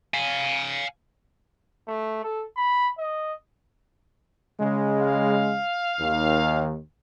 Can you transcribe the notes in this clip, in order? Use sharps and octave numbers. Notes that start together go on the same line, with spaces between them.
F5 G#5
A3
A4
B5
D#5
C#3 G#3
F5
D#2